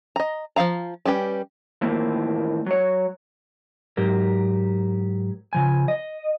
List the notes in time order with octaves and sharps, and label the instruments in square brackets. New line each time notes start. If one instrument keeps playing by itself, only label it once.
[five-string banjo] D#5 A#5
F3 F#3 F5 A#5
G3 C#4 G4 B4
[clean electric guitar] D#2 A2 E3 F3 A#3 C4
F#3 C#5
[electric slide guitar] G#2 F#3 G4 A#4
C#3 F3 G#5
D#5